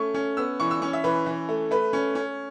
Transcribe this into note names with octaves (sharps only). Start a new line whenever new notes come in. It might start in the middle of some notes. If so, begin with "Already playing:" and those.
Already playing: A3 C#4 C#6
C#4
B3 E6
E3 C#6
E6
C#4 C#6
E5
E3 B4
E3
A3
A3 B4
C#4
C#4